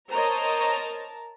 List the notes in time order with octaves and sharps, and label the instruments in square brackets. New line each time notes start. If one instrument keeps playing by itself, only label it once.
[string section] A#4 A5 A#5 [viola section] C5 C#5 D#5